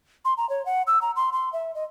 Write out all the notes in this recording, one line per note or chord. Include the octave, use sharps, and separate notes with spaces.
C6
A#5
C#5
F#5
E6
A#5
C6
C6
E5
D#5